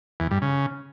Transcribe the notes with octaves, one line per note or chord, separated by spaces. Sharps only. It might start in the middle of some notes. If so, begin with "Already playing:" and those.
E2
G2
C#3